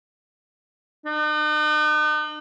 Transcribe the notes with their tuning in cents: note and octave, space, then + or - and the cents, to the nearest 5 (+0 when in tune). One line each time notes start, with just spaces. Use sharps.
D#4 -45